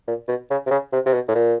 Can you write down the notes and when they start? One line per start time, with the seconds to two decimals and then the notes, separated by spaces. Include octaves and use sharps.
0.08 A#2
0.28 B2
0.50 C#3
0.66 C3
0.71 C#3
0.93 C3
1.06 C3
1.13 B2
1.28 A2
1.35 A#2